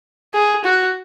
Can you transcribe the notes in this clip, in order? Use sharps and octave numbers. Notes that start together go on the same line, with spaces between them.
G#4
F#4